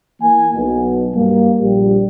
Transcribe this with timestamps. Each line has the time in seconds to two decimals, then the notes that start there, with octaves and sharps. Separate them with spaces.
0.21 E3 A#3 G#5
0.55 B1 B2
1.14 G2 G3 A#3
1.59 A#1 G3